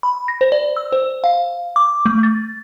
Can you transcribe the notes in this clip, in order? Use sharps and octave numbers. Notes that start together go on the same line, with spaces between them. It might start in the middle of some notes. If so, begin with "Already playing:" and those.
B5
A#6
C5
D5
E6
C5
F5
D6
A3
A6